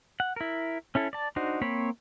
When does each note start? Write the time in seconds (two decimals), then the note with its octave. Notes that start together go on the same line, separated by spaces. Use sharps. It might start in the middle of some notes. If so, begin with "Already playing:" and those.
0.20 F#5
0.36 E4 A#4
0.95 C#4 E4 A4
1.13 D5 A5
1.36 D4 D#4 F#4 C5
1.61 A#3 C4 C5 C#5 B5